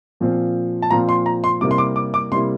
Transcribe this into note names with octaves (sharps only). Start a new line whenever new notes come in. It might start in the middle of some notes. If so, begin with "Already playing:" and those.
A#2 F3 C4 F4
A5
A#2 F3 C4 F4 A#5
C6
A#5
C6
C3 G3 A#3 E4 D6
C6
D6
D6
D6
C3 G3 A#3 E4 C6